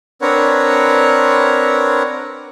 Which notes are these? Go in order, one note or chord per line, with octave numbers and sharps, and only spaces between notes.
C4 D4 A#4 B4 C#5 F#5